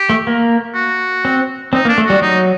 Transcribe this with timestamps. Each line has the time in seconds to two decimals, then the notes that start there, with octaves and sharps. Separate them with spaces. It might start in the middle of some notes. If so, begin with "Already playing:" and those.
Already playing: G4
0.10 A3
0.27 A#3
0.75 F#4
1.25 C4
1.73 C4 D#4
1.85 A#3
1.89 D4
1.98 A3
2.06 G3 F#4
2.22 F#3 D#4